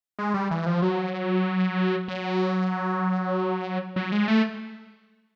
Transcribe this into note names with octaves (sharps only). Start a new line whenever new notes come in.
G#3
G3
E3
F3
F#3
F#3
F#3
G#3
A3